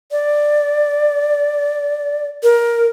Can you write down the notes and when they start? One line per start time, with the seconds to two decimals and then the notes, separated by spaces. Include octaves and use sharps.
0.12 D5
2.43 A#4